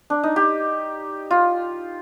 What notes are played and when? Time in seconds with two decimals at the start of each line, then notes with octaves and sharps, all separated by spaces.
0.10 D4
0.23 D#4
0.36 G4
1.31 F4